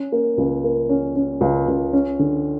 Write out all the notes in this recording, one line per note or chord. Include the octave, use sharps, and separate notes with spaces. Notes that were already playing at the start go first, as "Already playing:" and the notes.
Already playing: C#4
A#3
C#2
A#3
C#4
C#4
C#2
C#2
C#4
D3